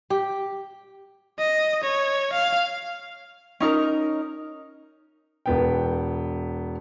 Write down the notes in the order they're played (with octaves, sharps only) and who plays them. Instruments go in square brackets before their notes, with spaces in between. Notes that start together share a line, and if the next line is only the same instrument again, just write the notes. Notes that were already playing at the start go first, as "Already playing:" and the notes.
[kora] G4
[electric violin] D#5
C#5
F5
[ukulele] C#4 D#4 A#4
[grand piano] E1 B3 G5